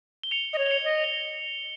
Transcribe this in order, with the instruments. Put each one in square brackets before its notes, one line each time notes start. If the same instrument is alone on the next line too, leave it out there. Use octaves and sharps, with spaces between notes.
[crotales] G7
C#7 F7
[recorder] D#5
C#5
[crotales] G7
C#7 F7
[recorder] D#5
[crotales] G7